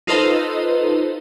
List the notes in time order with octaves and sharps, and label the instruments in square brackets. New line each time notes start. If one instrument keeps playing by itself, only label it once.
[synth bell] D#4 F4 A4 B4 C5 D#5